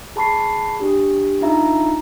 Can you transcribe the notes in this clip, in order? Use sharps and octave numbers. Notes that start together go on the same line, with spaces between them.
G#4 A5 B5 C#6 C7
D4 G4
D4 D#4 F4 E5 A#5